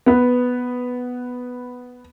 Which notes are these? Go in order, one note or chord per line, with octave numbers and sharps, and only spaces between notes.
B3 B4